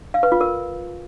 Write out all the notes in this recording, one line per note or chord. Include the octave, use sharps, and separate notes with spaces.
F5
B4
F4
A#4